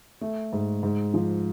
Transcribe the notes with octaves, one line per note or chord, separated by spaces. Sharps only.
A3
G#2
G#2
F3